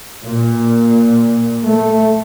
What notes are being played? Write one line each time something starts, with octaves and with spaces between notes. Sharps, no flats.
A#2
A3